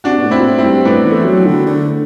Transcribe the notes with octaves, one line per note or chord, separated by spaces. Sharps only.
C3 D4 F#4
B2
A2
C4 E4
B2
A2
C4 E4
G2
A2 B3 D4
E3
A3
F#3
D3
D3 A3